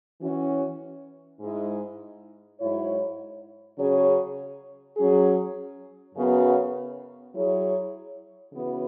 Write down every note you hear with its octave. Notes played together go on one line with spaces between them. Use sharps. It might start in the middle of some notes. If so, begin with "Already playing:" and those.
E3 C#4 F#4
G#2 G#3 E4
G#2 F#3 E4 C#5
C#3 F#3 C#4 G#4 C#5
F#3 C#4 G#4
F#2 C#3 F#3 B3 F#4
F#3 E4 G#4 C#5
C#3 E3 B3 F#4